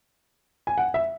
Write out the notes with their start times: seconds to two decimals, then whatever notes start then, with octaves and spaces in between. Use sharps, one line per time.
0.67 G#5
0.78 F#5
0.94 E5